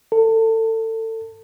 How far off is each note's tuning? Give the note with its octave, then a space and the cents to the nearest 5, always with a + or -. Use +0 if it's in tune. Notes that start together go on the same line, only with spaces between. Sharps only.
A4 +30